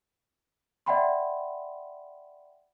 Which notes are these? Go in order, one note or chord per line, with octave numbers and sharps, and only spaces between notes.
D5 E5 F#5 G5 B5 C6